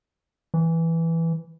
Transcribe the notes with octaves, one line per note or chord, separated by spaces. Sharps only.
E3